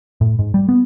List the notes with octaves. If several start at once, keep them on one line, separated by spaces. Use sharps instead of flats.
A2
G#2
G3
B3